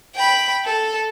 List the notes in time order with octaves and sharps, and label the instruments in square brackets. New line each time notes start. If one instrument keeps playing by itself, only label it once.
[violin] G5 B5
A4